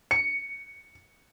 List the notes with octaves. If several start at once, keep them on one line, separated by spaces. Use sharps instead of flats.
C#7